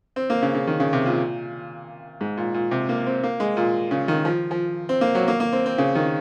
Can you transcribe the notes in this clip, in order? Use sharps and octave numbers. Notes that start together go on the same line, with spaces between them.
C4
A#3
C#3
C#3
D#3
C#3
C3
A#2
G#2
A#2
A#2
C3
A#3
C4
A#3
G#3
A#2
C#3
D#3
F3
F3
C4
A#3
F#3
A#3
A#3
C4
C4
C#3
D#3